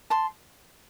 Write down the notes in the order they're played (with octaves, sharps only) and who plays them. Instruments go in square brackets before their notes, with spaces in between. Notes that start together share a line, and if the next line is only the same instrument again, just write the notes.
[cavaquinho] A5 C6